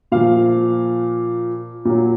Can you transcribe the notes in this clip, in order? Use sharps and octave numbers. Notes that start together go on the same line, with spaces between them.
A#2 F3 F5
A#2 F#3